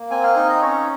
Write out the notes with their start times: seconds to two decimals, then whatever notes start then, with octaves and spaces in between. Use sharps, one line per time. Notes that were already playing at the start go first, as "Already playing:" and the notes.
Already playing: A#3
0.10 C4 G#5
0.23 F5
0.36 D#4 F5
0.49 D#5
0.62 C#4 C#5